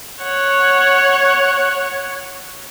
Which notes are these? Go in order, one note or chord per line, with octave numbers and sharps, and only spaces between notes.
C#5 F#5